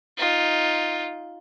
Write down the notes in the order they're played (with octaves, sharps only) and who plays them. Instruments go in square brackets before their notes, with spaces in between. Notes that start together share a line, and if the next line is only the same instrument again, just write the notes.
[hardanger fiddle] D#4 F4